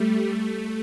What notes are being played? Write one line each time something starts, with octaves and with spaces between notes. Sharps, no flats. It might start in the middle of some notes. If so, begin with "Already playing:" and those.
Already playing: G3 A3
A3